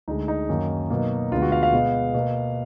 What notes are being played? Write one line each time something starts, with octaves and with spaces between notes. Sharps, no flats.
D2 D3 G#3 D#4
D#4
F#2 D#3 F#3 A#3
B2 F#3 A#3
D2 D3 G#3 B3 F4
F#4
F5
F5
B2 G#3 B3
B2 A#3